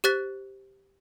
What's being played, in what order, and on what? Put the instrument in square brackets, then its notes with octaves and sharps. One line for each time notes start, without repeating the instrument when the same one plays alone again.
[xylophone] G4 C5 F#6 A6 B6